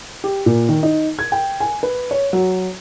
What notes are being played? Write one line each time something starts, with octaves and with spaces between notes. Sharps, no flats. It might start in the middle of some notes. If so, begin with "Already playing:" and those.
G4
A#2
D#3
D#4
G#6
G5
G#5
B4
C#5
F#3